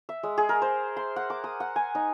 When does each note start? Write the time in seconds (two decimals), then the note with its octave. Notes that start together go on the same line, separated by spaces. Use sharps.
0.09 E5
0.23 G#3
0.38 G#4
0.49 A#4
0.62 C5
0.97 C6
1.16 F#5
1.30 D6
1.44 D#6
1.60 F#5
1.76 G#5
1.95 D#4